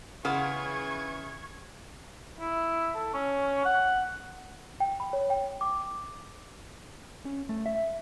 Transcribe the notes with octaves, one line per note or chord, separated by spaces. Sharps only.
C#3 E3 B3 F4 C#6 G#6
E4
A4
C#4
F#5
G5
B5
C#5
G5
D6
C#4
A3
E5